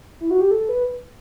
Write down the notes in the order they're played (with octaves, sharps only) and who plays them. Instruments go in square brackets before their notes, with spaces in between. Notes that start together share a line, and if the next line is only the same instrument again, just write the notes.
[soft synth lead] E4
F#4
G4
A4
B4